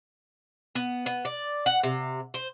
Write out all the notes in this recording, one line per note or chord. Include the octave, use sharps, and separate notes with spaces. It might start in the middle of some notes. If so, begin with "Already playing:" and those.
B3
B3
D5
F#5
C3
C5